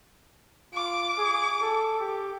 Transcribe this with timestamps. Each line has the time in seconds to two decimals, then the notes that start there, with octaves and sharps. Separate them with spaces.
0.74 F4 D6
1.18 G#4
1.62 A4
2.00 G4